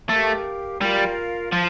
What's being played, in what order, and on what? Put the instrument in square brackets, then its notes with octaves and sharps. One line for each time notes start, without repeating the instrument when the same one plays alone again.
[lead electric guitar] A3 [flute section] G4 A#4 F5
[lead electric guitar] G3 [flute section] F4 A#4 F5
[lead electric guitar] F3 [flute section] F5 A5